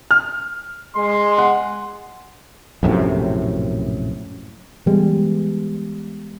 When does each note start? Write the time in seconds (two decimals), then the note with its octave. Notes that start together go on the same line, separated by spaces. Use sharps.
0.11 F6
0.96 G#3 C6
1.38 F#5
2.83 A#1 F#2 A2 C3
4.86 E3 G3 G#3 B3